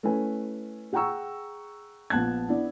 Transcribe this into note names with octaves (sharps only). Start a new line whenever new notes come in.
A3 C#4 E4 B4 G#5
G#4 F#5 G5 A#5 C#6 E6
A#1 B3 A5 F#6 G#6
B3 D4 E4